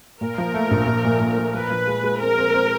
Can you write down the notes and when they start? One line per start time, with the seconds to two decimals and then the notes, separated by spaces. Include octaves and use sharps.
0.21 A#2 A#4
0.38 F3
0.54 A3
0.71 A#1
0.87 A#1
1.05 A#2
1.20 A#2
1.38 F3
1.54 F3 B4
1.71 F3
1.87 G#3
2.04 G#3
2.21 C4 A#4
2.38 C4
2.54 C4